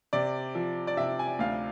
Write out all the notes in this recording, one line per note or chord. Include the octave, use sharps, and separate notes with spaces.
C3 D5
F3
D5
C3 E5
G#5
D2 F5